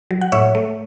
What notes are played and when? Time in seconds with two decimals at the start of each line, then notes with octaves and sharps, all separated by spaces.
0.11 F#3
0.21 F#5
0.32 A2 C#5 E5
0.55 A3